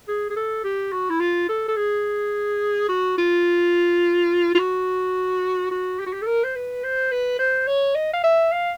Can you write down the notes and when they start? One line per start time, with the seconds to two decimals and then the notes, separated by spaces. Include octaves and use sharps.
0.08 G#4
0.30 G#4
0.36 A4
0.64 G4
0.92 F#4
1.10 E4
1.20 F4
1.49 A4
1.68 A4
1.76 G#4
2.89 F#4
3.18 F4
4.55 F4
4.59 F#4
5.71 F#4
5.99 G4
6.06 F#4
6.13 G4
6.22 A4
6.27 A#4
6.44 C5
6.56 B4
6.84 C5
7.12 B4
7.39 C5
7.67 C#5
7.95 D#5
8.14 F5
8.24 E5
8.52 F5